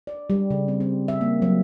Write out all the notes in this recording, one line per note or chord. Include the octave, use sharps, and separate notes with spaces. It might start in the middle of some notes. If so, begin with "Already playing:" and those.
D5
G3
C#3
C4
C4
E5
A#3
F#3